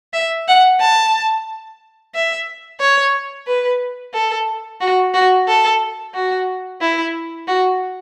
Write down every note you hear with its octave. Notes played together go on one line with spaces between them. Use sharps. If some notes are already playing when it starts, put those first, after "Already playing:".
E5
F#5
A5
E5
C#5
B4
A4
F#4
F#4
A4
F#4
E4
F#4